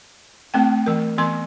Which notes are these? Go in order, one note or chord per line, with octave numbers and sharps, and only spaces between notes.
A3 C4 G5
E3 A#4
E3 B3 C6